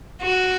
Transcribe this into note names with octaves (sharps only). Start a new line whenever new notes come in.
F#4